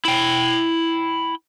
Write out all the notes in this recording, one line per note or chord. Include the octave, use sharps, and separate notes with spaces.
E4 G5